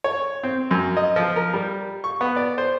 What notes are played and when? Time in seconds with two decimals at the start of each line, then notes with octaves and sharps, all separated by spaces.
0.04 C#5
0.43 C4
0.71 F#2
0.97 D#5
1.16 F3
1.36 A#4
1.54 G3
2.04 C#6
2.21 B3
2.36 D5
2.58 C5